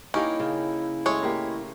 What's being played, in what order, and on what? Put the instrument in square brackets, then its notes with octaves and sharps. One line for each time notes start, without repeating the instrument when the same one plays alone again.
[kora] A#3 G4 A#4 [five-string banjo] C#4 [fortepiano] D#4 [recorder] E4
[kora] C#3
[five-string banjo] G#3 C#5 [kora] A3
[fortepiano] A#3 G4